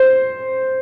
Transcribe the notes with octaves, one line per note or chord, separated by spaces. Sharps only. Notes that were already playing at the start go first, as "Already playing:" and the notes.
Already playing: C5